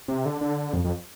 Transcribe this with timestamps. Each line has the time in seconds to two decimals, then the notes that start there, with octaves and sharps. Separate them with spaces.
0.08 C3
0.26 D3
0.41 D3
0.73 F2
0.85 F2